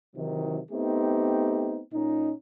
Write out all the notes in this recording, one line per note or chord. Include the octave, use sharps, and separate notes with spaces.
C3 D#3 E3 F#3 D#4
A3 B3 C4 D#4 G4
A#2 C#4 D#4